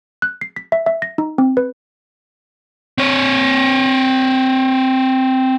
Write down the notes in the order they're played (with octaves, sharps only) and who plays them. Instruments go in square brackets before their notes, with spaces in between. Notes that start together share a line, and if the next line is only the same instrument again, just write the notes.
[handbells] F#6
C7
B6
E5
E5
A#6
D#4
C4
B4
[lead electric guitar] C4 C#5